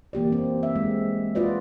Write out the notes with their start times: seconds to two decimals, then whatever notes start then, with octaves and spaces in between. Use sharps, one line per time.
0.13 E3 A#3 G4 D5
0.32 C4
0.63 E5
0.76 G#3
1.35 F4 F#4 B4 D5 D#5